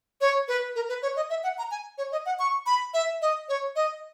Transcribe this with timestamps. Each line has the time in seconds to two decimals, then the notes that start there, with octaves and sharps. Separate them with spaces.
0.21 C#5
0.48 B4
0.76 A#4
0.89 B4
1.02 C#5
1.16 D#5
1.30 E5
1.43 F#5
1.58 A#5
1.71 G#5
1.98 C#5
2.12 D#5
2.26 F#5
2.39 C#6
2.66 B5
2.94 E5
3.22 D#5
3.49 C#5
3.76 D#5